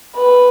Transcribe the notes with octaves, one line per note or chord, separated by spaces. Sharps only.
B4